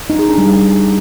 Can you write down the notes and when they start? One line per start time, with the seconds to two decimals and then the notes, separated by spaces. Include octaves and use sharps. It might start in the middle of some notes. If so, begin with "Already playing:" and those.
0.10 D#4
0.19 G#4
0.29 D4
0.38 G3